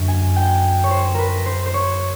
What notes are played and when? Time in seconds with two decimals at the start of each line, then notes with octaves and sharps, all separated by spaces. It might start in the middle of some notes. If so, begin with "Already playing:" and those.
Already playing: F#2 D3 A#3
0.08 G#5
0.36 G5
0.84 C#5
0.91 C5
1.14 A#4 B4
1.46 C5
1.66 C5
1.74 C#5